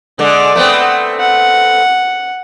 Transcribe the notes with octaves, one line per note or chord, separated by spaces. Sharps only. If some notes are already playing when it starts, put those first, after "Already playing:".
D3 G#3 D5
A3 B3 C4
F#5